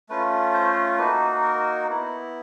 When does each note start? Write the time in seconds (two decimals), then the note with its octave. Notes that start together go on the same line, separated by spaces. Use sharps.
0.09 A3 C#4 F4 B4
0.54 C5
0.98 A#3 D#4 F#4 B4
1.43 A#4
1.89 B3 E4